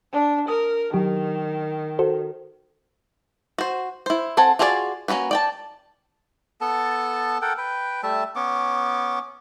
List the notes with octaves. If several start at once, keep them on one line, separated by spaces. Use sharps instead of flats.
D4
A#4 D#6
D#3 F#3 G4
F#4 A4 C5
F#4 C5
E4 C5
C4 A4 F#5 G#5
F4 F#4 G#4 A4 D5
A#3 C#4 F4 F#4 B4
D5 G5 A5
B3 A4 A5
A4 A#4 F#5 G5
B4 G5
G3 A3 E5 A5
B3 C#4 D6